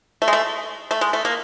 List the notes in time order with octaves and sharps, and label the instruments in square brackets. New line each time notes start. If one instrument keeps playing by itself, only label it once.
[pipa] A3
G#3
A3
A3
G#3
A3
A#3